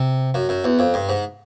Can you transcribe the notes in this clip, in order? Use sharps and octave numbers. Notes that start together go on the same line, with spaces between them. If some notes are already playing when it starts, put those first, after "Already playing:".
Already playing: C3
F#2
F#2
E2
F2
G2
G#2